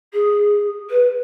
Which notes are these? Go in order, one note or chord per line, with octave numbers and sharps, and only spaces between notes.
G#4
B4